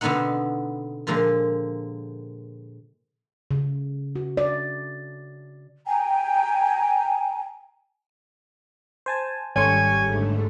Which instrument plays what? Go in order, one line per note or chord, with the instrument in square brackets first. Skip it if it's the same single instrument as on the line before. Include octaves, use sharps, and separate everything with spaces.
[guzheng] B2 D3 B3 C4 D#4 F#5
A#2 D3 F3 G#3 A#3
[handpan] C#3
F#4
D5
[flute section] G5 G#5 A#5
[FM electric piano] C5 G#5 A5
[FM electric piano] G#1 C#5 C#6 [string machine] G3 [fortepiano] C#4 A4 C6 [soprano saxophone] G#5
[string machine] G#2 D3 A3